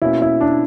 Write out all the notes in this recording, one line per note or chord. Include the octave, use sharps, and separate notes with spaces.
B2 A#3 C#4 E4
E4
D4